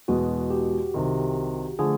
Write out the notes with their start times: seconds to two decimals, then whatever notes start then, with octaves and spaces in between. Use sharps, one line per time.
0.08 E2 B2 G#3 F#4
0.51 G4
0.94 C2 C3 D#3
1.79 D3 F3 A3 G#4